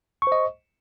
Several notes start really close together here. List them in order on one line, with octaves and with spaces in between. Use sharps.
C#6 C5 D#5